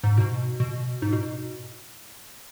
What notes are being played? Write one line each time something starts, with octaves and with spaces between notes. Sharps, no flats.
G#2
B2
B2
G#2
B2